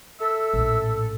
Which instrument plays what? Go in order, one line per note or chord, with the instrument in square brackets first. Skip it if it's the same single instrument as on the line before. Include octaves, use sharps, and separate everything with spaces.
[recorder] A4 [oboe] E5
[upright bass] A#1 A2